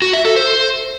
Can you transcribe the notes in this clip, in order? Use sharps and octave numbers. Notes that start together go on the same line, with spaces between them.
F#4
E5
A4
C5